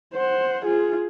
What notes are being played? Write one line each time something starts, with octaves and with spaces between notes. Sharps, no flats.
C5 F#5
F4 G#4